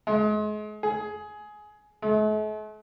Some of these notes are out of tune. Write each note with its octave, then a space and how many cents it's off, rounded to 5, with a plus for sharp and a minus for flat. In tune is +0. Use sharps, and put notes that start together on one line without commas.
G#3 +35
G#4 +15
A3 -45